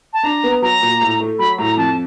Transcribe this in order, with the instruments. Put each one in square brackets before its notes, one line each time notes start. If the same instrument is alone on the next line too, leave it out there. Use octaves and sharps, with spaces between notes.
[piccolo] A5
[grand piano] D4 [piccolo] A#5
[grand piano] B3
[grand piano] F#3 [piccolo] A#5
[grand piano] A#2
A2
A3
[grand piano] F#3 [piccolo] B5
[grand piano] A2 [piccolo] A#5
[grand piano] F2 [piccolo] A5